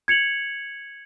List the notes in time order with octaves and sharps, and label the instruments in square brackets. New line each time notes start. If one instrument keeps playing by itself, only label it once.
[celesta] G#6 C#7 F7 F#7